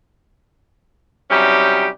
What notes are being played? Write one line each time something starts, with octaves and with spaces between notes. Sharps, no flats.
C3 F#3 G3 C#4 D#4 G4